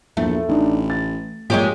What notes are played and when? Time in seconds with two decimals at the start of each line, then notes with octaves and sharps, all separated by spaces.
0.17 A#1 E2 A3
0.49 A1 D4 D#4
0.90 A6
1.50 A#2 F3 G#3 C#4 G4